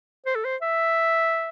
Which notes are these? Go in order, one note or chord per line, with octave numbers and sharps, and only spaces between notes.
C5
A4
C5
E5